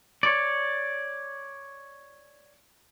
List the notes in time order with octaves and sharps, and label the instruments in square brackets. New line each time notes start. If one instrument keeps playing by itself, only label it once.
[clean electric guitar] C#5 D5